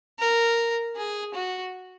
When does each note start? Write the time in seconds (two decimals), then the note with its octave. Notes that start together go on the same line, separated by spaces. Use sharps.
0.19 A#4
0.96 G#4
1.34 F#4